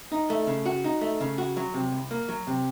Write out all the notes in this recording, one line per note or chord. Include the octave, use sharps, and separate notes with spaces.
D#4
A3
C#3
F#4
D#4
A3
C#3
F#4
F#3
C3
C2
A#3
F#3
C3